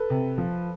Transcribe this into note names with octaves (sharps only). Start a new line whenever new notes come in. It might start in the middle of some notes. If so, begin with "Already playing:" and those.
Already playing: A4 B4
C3
F3